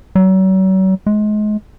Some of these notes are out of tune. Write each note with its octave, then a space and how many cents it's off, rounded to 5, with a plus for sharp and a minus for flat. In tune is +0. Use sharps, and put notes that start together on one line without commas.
F#3 +40
G#3 +30